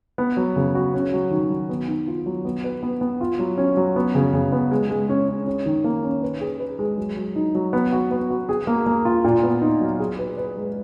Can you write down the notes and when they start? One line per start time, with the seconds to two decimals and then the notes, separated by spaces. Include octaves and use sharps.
0.18 B3
0.37 F#3
0.56 C#3
0.75 F#4
0.94 C#4
1.13 F#3
1.31 D#3
1.50 F#3
1.69 B3
1.88 D#3
2.07 F4
2.26 F#3
2.45 B3
2.64 B4
2.83 B3
3.01 B3
3.21 F4
3.39 F#3
3.58 C#4
3.77 F#3
3.96 B3
4.15 C#3
4.33 C#3
4.52 B3
4.71 G#3
4.90 G#3
5.09 C#4
5.28 C#4
5.47 C#4
5.66 D#3
5.84 A#3
6.03 C#4
6.22 B4
6.41 G#4
6.60 B4
6.79 G#3
6.97 F#3
7.16 F#3
7.36 D#4
7.55 F#3
7.73 B3
7.92 F#4
8.11 B3
8.30 F#4
8.49 G#4
8.67 A#3
8.86 A#3
9.05 F4
9.24 A#2
9.43 B3
9.61 D#4
9.80 F#3
9.99 G#4
10.19 B4
10.37 B4
10.57 G#3